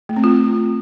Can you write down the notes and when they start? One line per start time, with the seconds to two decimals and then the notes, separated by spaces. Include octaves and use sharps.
0.09 A3
0.16 C4
0.24 F4